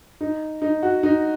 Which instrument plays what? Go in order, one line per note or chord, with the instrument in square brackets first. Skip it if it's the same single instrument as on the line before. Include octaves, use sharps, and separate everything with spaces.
[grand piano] D#4
D#4
F#4
D#4